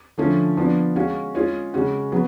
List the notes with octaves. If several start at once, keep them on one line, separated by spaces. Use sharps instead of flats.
D3 F3 A3 C#4
F3 B3 D4
G#3 C#4 F#4 C#5 F5
G#3 C#4 F4 G#4 C#5
C#3 G#3 C#4 F#4
F#3 B3